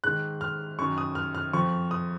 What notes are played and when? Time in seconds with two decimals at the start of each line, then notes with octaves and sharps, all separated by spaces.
0.04 G#2 D#3 F#6
0.41 F6
0.79 F#2 D#3 C#6
0.98 D#6
1.15 F6
1.35 F6
1.53 F2 F3 C#6
1.91 D#6